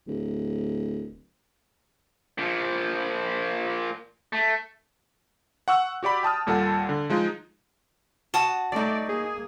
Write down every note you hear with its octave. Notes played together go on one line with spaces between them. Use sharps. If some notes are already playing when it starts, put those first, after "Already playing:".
D1
A#2 F3
A3
F#5 C#6 E6 F#6
F#4 G4 D5 B5
G5 A5 D#6 F6
D#2 A#2 G3 A4 F#5 A5
D3
F3 G#3 D#4 F4
F#4 A5 D#6
F#3 A3 D#4 D5
A#3 G#4